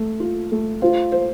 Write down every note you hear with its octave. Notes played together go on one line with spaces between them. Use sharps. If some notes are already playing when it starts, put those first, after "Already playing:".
Already playing: A3
F4
A3
F4 C5
C5